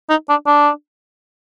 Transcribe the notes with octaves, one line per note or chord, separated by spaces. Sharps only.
D#4
D4
D4